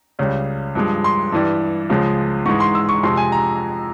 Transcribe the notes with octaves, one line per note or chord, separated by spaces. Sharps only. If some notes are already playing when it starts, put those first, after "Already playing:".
C#2 C#3 G3
G2 F3 G#3
C6
G2 E3 G3
C#2 C#3 F3 G#3
G#2 E3 G#3 C#6
C6
E6
C#6
F2 C3 F3 G#3 C6
G#5
A#5